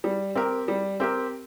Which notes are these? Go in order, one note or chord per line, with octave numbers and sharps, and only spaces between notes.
G3
C4 G4 A#4
G3
C4 G4 A#4